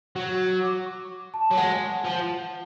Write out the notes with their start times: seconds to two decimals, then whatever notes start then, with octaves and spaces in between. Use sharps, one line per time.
0.16 F#3
0.63 D6
0.86 C#6
1.34 A5
1.51 F#3
1.57 G#3 F#5
2.05 F3